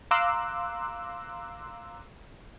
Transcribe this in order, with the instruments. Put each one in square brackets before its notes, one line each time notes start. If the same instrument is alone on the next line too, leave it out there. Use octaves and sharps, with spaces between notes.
[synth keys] F5 A#5 C6 D6 E6 F#6